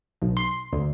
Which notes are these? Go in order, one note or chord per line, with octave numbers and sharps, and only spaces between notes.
B1
C6
D2